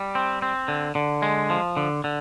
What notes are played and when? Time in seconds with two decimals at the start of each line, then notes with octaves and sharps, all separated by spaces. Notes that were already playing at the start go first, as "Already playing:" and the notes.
Already playing: G3
0.15 C4
0.42 C4
0.68 D3
0.95 D3
1.22 G#3
1.50 F3
1.77 D3
2.04 D3